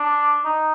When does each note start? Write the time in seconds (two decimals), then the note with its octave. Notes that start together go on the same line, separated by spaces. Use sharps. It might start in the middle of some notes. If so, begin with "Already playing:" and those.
Already playing: D4
0.45 D#4